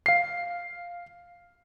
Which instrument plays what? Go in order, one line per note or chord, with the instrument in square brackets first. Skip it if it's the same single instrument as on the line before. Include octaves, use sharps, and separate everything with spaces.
[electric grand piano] F5 C7